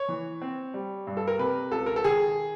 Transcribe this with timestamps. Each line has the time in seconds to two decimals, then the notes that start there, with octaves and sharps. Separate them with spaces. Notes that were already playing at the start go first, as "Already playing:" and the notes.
Already playing: C#5
0.08 E3
0.42 C4
0.74 G3
1.07 G2
1.17 A4
1.27 A#4
1.39 C3 B4
1.71 C#2 A4
1.86 A#4
1.96 A4
2.04 D#3 G#4